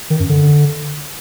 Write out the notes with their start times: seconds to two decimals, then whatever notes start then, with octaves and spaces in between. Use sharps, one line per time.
0.10 D#3
0.20 F#2
0.29 D3